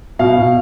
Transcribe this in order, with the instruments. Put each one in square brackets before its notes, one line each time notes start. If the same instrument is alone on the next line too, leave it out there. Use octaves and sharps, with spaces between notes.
[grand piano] B2 F5
B2